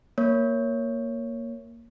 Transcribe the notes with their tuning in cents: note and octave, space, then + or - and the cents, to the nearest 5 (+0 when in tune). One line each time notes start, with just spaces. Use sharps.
A#3 +0 C#5 +0